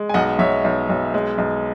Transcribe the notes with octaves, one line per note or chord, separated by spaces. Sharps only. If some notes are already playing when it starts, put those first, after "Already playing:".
Already playing: G#3
G#5
B1 D#5 F#5
B1 C#5 E5
B1
B1
G#3
B1